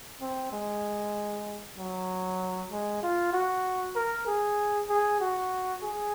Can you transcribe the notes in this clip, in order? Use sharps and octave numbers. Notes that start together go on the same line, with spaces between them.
C4
G#3
F#3
G#3
F4
F#4
A#4
G#4
G#4
F#4
G#4